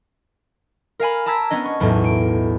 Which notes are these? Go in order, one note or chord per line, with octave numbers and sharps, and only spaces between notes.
A#4 F5 G#5 B5
A5 A#5 D6 E6 G#6 B6
B3 C#4 D4 D#5
C#6
B1 E2 A2
D7